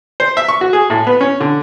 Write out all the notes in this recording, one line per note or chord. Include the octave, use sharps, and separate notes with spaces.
C5
E5
C#6
F#4
G#4
A2
B3
C#4
D3